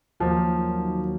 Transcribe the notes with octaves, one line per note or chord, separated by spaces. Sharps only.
D#2 D#3 F3 F#3 A#3